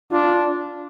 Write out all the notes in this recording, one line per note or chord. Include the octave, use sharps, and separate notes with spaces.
D4 F4